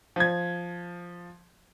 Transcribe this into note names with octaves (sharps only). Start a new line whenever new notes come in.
F3 G#6